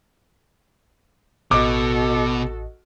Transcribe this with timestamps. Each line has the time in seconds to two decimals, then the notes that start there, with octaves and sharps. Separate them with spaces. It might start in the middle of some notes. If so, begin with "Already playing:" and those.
1.51 A1 B2 F#4 A4 D#5 D6